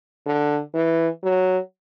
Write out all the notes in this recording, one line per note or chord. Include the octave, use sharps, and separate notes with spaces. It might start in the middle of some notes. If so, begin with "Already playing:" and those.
D3
E3
F#3